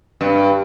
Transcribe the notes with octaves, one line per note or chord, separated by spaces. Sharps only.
G2